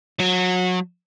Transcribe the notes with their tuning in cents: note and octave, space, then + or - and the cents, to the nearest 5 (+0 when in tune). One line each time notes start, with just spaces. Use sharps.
F#3 -25